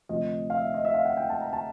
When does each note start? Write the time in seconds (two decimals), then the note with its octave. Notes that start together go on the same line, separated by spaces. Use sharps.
0.09 D2 C3 F3 D#5
0.50 F5
0.57 E5
0.74 D#5
0.85 E5
0.94 F5
1.05 F#5
1.17 G5
1.29 A5
1.41 A#5
1.53 A5